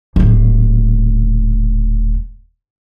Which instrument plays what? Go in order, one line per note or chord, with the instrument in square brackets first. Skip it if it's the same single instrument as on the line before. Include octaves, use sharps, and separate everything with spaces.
[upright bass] D#1 A2